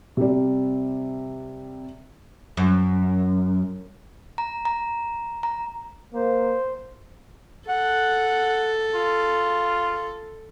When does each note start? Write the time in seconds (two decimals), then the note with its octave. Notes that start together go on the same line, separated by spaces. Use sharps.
0.17 C3 G3
2.57 F#2
4.38 A#5
4.65 A#5
5.43 A#5
6.14 A#3 C5
7.69 A4 F#5
8.95 F4